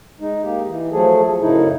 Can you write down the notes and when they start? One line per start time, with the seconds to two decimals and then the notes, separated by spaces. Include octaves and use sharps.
0.20 G#3 D#4
0.44 A#3 D#4 G4
0.67 E3
0.92 F3 F#3 A3 G#4 A4
1.41 F#2 A2 C#3 D#4 E4